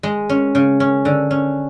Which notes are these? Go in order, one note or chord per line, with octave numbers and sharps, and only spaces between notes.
G#3
C#4
C#3
C#4
D3
C#4